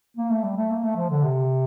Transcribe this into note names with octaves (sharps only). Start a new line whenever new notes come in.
A#3
A3
G3
A3
A#3
A3
F3
D3
C3